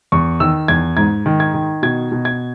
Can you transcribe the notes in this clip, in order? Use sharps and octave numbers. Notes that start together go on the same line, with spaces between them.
E2 C#6
D#3 E6
E2 G#6
G#2 G#6
D#3
G#6
D#3
B2 G#6
B2
G#6